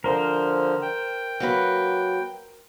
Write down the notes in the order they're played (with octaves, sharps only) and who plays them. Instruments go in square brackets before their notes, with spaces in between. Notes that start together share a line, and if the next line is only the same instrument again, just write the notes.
[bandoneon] D3 F3 [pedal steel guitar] A#4 C5
[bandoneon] G5
[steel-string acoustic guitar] F#3 A#3 B4